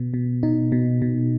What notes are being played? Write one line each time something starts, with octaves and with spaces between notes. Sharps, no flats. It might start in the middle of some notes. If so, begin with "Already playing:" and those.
Already playing: B2 B3
B2
B2 D#4
B2
B2